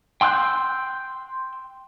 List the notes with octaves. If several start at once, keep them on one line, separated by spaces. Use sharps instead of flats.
G5 C6 E6 F#6 G6